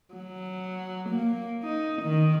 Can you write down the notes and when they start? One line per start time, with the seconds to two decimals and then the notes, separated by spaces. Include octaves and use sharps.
0.14 F#3
1.09 A#3
1.63 D#4
2.02 D#3